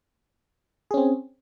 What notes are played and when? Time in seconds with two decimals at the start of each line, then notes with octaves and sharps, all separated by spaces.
0.91 G#4
0.94 C#4
0.97 C4